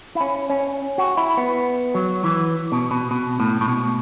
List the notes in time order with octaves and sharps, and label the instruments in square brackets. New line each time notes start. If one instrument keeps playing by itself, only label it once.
[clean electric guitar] E4
C#4
C#4
F#4
E4
B3
F#3
E3
B2
B2
B2
A2
A2
B2